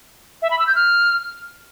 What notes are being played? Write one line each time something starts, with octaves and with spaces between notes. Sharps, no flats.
E5
B5
E6
G6
F6